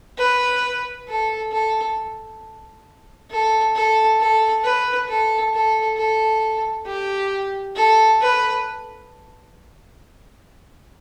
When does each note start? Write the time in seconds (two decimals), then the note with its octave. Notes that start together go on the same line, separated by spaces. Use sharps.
0.18 B4
1.08 A4
1.52 A4
3.31 A4
3.75 A4
4.20 A4
4.64 B4
5.09 A4
5.53 A4
5.97 A4
6.86 G4
7.76 A4
8.21 B4